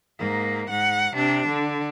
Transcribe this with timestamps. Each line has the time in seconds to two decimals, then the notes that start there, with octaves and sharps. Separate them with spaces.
0.19 G#2 A#3
0.69 G#2 F#5
1.14 C3 D4
1.47 D3